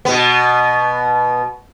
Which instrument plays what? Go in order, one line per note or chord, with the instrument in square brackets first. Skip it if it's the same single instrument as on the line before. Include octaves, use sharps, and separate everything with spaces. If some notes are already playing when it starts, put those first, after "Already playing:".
[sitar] B2 B3